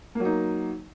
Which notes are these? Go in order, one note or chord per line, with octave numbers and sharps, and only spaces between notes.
F#3 A#3 D#4